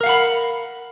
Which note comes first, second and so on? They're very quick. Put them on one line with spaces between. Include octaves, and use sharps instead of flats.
A#4 F5 F#5 B5